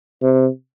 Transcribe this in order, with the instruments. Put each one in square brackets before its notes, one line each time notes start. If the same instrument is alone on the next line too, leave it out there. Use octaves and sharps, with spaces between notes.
[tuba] C3